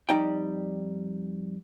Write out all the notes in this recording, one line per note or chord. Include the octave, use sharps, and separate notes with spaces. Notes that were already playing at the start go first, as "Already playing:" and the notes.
F2 G3 D#4 D5 G5